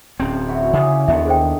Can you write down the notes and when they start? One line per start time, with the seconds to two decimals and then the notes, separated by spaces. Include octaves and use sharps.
0.20 D1 C4 C#4
0.48 E4 F#4 C#5
0.73 C#3 G4 G#4 D5
1.08 D#2 D3 D#3 B3 D4 E5
1.26 G#4 C5 G5